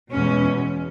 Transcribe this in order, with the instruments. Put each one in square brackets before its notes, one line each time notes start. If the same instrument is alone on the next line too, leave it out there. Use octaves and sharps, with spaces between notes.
[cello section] E2 B2 G#3 C#4